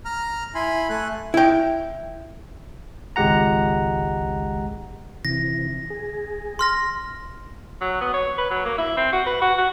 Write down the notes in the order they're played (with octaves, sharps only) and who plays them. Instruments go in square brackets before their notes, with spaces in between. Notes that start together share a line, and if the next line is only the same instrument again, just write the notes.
[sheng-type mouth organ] A#5 F6
E4 G#5 B5 C6
A3 A4 G#5 F#6
[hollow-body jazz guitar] E4 G5
[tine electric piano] G#1 C#2 G#3 G4 F#5 A#5
[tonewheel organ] C3 E3 [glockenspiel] A#6
[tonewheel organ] G#4
[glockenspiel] C6 F6 A#6
[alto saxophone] F#3
B3
C#5
B4
F#3
A#3
E4
C4
F#4
B4
F#4
F#4